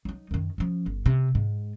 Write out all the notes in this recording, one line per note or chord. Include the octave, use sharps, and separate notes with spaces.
F#3 D#4
F#2 D#3
F3 C#4
G1
C3
G#2